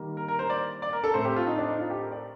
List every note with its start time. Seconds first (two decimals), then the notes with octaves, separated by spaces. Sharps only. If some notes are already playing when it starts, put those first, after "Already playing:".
Already playing: D#3 G3 A#3
0.17 A#4
0.28 A#4
0.39 C5
0.50 D5
0.82 D5
0.93 A#4
1.04 A4
1.14 A2 A3 C4 C5
1.25 G4
1.36 F4
1.47 D#4
1.58 D4
1.69 D#4
1.79 F4
1.90 G4
2.01 A#4
2.12 D5